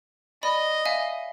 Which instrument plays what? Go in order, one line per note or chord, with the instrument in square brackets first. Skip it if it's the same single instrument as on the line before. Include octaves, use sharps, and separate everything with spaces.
[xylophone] D5 B5 [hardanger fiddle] D#5
[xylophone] E5 F5 G#5